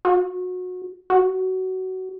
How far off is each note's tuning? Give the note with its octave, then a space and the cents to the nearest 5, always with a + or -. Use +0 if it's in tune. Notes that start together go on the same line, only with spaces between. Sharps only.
F#4 -25
F#4 +20